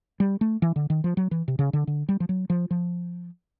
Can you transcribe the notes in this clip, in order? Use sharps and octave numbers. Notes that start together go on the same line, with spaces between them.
G3
A3
E3
D3
D#3
F3
F#3
E3
C3
C#3
D3
D3
G3
F3
F#3
F3
F3